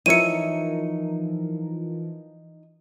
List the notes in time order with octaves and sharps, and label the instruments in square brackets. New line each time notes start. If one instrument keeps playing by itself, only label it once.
[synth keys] E3 F3 A#4 [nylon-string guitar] D#4 C#5 E5 [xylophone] C#7 D#7